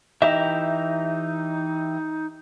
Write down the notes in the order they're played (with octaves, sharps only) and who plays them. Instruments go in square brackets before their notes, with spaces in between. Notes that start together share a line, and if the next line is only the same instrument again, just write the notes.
[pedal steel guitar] E3 G4 A#5 [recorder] D#4 [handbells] D#5 [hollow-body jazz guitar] E5